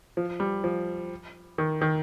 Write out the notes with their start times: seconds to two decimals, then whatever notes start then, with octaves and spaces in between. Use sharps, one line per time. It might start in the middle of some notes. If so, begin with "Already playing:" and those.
0.17 F3
0.40 G3
0.64 F3
1.58 D#3
1.82 D#3